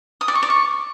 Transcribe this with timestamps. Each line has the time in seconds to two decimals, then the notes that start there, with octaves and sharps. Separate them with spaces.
0.21 D#6
0.28 D5
0.35 C#6
0.43 D5
0.50 C#6